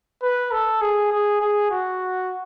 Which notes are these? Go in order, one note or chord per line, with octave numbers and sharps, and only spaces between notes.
B4
A4
G#4
G#4
G#4
F#4